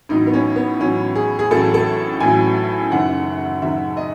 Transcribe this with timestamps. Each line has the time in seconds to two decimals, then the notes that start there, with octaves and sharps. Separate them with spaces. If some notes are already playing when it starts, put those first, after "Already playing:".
0.09 A1 A2 F#3 D#4
0.27 B3
0.34 C#4
0.56 B3
0.80 A1 A2 F#3 C#4
1.15 G#4
1.39 G#4
1.51 A1 A2 F#3 A4
1.74 A4
2.20 A1 A2 F#3 G#5
2.91 F#1 F#2 D#3 F#5
3.62 F#1 F#2 D#3 E5
3.97 D#5